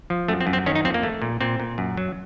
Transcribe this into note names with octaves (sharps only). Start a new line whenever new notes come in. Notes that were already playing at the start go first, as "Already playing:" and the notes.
F3
F#2 A3
C4
F#2
C4
D#3 C#4
D#4
F2 C4
A#3
A3
A#2
A#2 C4
A#2
F#2
F#3